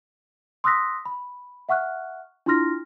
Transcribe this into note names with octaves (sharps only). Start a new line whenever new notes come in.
C6 D#6 E6 F#6 A#6 B6
B5
E5 F#5 C#6 F6 F#6
D4 E4 F4 C6 F6 A#6